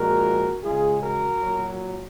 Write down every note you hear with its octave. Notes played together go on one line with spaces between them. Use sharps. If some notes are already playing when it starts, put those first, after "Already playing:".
Already playing: A#2 F3 G#3 F#4 A#4
C#3 G#3 F4 G#4
F#4 A#4
A#2 F#3